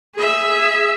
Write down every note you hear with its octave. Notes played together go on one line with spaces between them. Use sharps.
G#4 E5